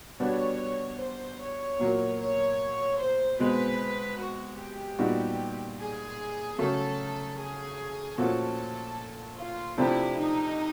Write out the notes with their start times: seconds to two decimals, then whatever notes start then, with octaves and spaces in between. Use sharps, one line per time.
0.19 B2 G3 B3 D4 F#4 C#5
0.99 C5
1.40 C#5
1.79 A#2 F#3 A#3
2.19 C#5
2.99 C5
3.39 B2 G#3 C4 B4
4.19 F#4
4.59 G4
4.99 A#2 G3 B3 D#4 F#4
5.78 G#4
6.58 C#3 F#3 A3 C#4 A4
7.38 G#4
8.18 A#2 F3 A3 C#4 F#4 A4
9.38 F4
9.77 C3 F3 A3 D4 E4 G4
10.17 D#4